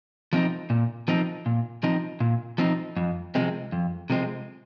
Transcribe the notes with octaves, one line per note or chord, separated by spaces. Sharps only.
F3 C4 D#4
A#2
F3 C4 D#4
A#2
F3 C4 D#4
A#2
F3 C4 D#4
F2
C3 F3 G#3 C4
F2
C3 F3 G#3 C4